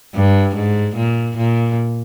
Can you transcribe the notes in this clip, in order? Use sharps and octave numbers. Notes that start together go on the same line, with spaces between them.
G2
G#2
A#2
A#2